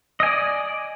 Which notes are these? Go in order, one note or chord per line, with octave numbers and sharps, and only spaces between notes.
D5 D#5 G#5